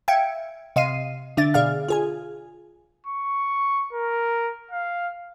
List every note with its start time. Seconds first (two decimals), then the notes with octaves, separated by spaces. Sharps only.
0.08 E5 F5 G5 G#6 C#7 D7
0.76 C3 D#5 F5 C7 D#7
1.37 D3 D4 E5 A6
1.54 B2 G#4 D5 F5 F6
1.88 F4 G#4 G#5
3.06 C#6
3.93 A#4
4.71 F5